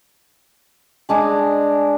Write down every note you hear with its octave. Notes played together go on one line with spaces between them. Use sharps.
G#3 D4 D#5 G#5